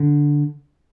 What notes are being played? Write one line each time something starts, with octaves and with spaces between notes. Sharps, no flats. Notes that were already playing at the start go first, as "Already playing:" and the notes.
Already playing: D3